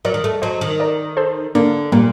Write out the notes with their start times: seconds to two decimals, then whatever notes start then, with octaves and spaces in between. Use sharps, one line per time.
0.05 F#3 A#4 D5
0.14 D#3
0.24 A3
0.42 F#3 C5 D#5
0.61 D#3
0.80 A#4 D5
1.17 A4 C5
1.55 D3 A#3 D4
1.92 A#2 G3 A#3